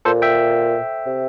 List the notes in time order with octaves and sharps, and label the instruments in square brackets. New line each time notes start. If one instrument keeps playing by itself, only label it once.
[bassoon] A#2 [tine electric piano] A4 C5
[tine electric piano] E5 G5
[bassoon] C3